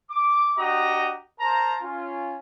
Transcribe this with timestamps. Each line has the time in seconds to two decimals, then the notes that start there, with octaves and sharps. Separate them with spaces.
0.10 D6
0.57 D4 F#4 G4 D#5 A#5 D#6
1.39 A#4 C5 A5 A#5
1.82 C#4 F4